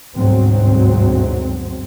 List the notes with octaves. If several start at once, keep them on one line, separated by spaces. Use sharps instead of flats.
G1 D2 G#2 B2 F#3 C4